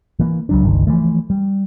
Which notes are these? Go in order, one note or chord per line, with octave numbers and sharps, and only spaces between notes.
E3 A#3
C#2 F#3 D4
G1 C#2 D#3
E3 F3 A3
G3